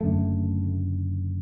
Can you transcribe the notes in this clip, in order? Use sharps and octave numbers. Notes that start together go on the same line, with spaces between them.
F#1 F#2 D3 A3